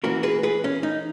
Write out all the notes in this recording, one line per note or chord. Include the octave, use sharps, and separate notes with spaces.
E3 A#3 C#4 F#4 A#4
G#4 B4
G#4 B4
C#4
D#4